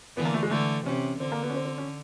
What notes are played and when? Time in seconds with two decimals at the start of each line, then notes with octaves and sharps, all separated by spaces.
0.16 D3 E3 B3
0.25 A#3
0.34 A3
0.43 G#3
0.51 D3 A3
0.85 C3 C#4
1.20 D3 C4
1.32 A#3
1.43 B3
1.50 C#4
1.55 C4
1.65 C4
1.78 C#4